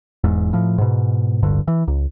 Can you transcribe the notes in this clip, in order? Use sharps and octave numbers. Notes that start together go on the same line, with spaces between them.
E1 E2 G#2
A2 F3
G#2 B2
D1 G1 G2 D3
E3
C#2